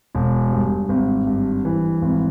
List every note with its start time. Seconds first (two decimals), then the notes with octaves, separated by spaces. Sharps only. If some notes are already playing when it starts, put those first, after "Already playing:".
0.15 E1
0.52 G2
0.89 G#1
1.27 G2
1.65 E3
2.02 G#1